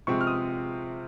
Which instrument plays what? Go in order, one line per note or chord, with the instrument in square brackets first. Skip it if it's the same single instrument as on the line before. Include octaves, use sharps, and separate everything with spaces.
[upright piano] C3 F3 G#3 C4 C#6
F6
D#6